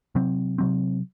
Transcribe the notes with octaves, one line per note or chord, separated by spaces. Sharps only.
C3 F#3 C4
C3 F#3 C4